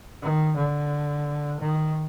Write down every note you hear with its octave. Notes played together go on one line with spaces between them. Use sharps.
D#3
D3
D#3